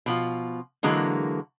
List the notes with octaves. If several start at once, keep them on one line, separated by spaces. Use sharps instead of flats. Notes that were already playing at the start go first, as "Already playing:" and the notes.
B2 F3 F4
D3 E3 F#3 G#3 A#3